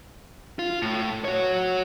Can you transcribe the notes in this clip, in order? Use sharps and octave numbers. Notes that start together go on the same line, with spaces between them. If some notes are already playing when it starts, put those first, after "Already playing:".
F4
A2
F#4 C#5